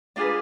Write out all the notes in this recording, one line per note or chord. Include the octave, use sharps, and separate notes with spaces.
D4 F4 G#4 B4 D5